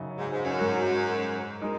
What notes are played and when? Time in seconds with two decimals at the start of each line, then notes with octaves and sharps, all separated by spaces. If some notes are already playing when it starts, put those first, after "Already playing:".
Already playing: F#2 C#3 F#3 D#4
0.18 G#2
0.31 G#2
0.45 F#2
0.57 G#2 G#3 F#4 A#4
1.62 G#3 D#4 A#4